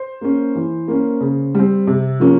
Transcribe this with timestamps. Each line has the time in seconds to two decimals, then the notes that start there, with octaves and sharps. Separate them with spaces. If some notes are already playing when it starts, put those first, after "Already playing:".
Already playing: C5
0.21 A#3 C#4
0.55 E3
0.88 A#3 C#4
1.21 C#3
1.55 G3 C4
1.87 C3
2.20 F3 A#3 C#4